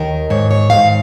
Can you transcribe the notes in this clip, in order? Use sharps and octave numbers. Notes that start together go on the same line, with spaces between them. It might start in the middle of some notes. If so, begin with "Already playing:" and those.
Already playing: D#2 D#3 A#4
G#2 C#5
C#5
G#2 F5